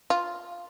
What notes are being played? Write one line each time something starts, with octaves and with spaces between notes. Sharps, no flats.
F4